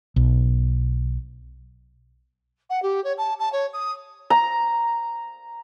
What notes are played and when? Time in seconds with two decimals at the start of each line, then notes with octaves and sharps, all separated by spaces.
0.16 B1
2.70 F#5
2.83 G4
3.04 C#5
3.18 A5
3.39 A5
3.53 C#5
3.73 D#6
4.30 A#5